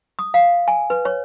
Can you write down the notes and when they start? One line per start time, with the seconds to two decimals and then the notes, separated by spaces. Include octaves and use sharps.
0.19 D#6
0.34 F5
0.68 G#5
0.90 B4
1.05 C#5